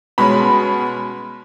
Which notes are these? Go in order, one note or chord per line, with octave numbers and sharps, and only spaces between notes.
B2 G#3 C#4 B5